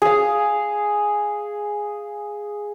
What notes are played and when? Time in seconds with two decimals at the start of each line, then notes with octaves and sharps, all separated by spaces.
0.02 G#4 F5